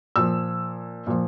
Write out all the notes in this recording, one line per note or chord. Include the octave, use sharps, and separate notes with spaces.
A#2 F3 E6
A#2 F3